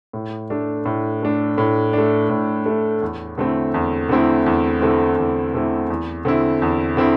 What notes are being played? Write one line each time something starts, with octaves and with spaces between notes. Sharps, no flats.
A2
A3 D4
A2
A3 D4
A2
A3 D4
A2
A3 D4
E2
D3 A3 C4 E4
E2
D3 A3 C4 E4
E2
D3 A3 C4 E4
E2
D3 A3 C4 E4
E2
D3 C4 E4
E2
D3 C4 E4